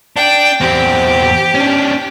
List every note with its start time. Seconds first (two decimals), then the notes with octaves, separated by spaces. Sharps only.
0.16 D4 G5
0.61 E2 C4 G4
1.55 C#4 D4